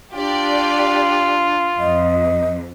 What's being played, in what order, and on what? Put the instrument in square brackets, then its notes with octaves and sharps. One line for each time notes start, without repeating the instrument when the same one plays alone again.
[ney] D4 [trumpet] F4 [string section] G4 D5
[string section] F2 [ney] D#5